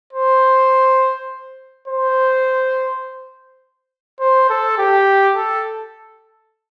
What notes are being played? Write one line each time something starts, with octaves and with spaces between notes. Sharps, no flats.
C5
C5
C5
A4
G4
A4